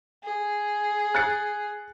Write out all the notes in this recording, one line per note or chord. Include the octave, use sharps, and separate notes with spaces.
G#4
F#6 A6 C#7